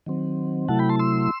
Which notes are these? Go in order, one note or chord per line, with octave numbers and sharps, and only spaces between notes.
D#3 F#3 C4
C3 F#3 A3 E4 F#5 A5
G5 B5
A5 C6
C6 E6